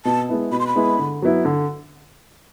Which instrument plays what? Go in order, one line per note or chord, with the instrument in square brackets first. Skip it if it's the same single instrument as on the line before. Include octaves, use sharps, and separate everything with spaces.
[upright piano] B2 [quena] A5
[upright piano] G#3 B3 E4
[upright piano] B2 [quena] B5
[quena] C6
B5
[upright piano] G#3 B3 E4
D3
F#3 B3 E4
D3